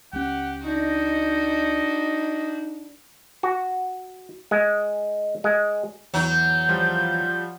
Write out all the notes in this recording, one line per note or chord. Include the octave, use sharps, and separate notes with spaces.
C#2 C#4 G4 F#5
D4 D#4 F#4 D#5
F#4
G#3
G#3
E2 E3 F#3 G6
F3 G3 F4